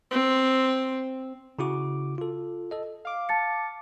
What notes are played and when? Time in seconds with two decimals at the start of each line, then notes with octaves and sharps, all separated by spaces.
0.11 C4
1.59 C#3 E4 F#4 D6
2.18 F4 A4
2.71 A4 D#5
3.05 F5 D6
3.29 A5 A6 C#7